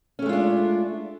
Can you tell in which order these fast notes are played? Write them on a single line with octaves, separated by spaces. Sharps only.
C#4 A3 G#3 F4 D4